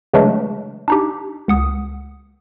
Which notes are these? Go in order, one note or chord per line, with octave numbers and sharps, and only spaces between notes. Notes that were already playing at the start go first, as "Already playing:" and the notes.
C#3 E3 F#3 G#3 A3 D4
D4 D#4 G4
C#2 F#5 D#6